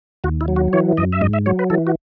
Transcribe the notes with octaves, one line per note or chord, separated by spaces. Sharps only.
D#2 F#4
E4
F#3
F#4
E3 C#5
F#2 D#5
E5
G#2 D#5
E5
F#3 C#5
B4
E3 A4
F#4